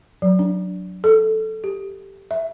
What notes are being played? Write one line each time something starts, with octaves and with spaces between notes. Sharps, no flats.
F#3
D4
A4
G4
E5